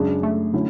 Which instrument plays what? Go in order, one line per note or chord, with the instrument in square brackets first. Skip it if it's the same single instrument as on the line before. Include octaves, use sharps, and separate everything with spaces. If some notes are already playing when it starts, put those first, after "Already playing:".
Already playing: [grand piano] F#2 C#3 G#3 D4
[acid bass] A3
[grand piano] D3 F#3 C#4 E4